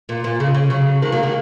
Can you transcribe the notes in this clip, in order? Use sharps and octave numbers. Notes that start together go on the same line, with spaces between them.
A#2
A#2
C#3
C#3
C#3 F#3
D#3 G#3
F#3 A#3
D#3 G#3